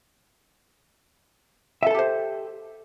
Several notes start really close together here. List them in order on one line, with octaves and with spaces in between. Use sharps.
E5 A4 A5 G4 C5